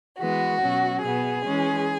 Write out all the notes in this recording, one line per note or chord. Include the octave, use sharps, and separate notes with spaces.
E3 G#3 B3 F#4
B2 F#3 C#4
B2 B3 G#4
E3 G#3 C#4